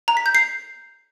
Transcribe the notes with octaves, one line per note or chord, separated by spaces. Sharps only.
A#5
B6
G6
C7